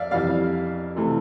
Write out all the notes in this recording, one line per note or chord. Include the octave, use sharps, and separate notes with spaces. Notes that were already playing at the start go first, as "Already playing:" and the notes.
Already playing: F2 D5 E5 F5
F2 E3 G3 D5 F5
C3 E3 A3